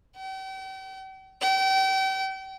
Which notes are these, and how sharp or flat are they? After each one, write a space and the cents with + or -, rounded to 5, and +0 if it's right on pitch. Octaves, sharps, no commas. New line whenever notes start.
G5 -40
G5 -35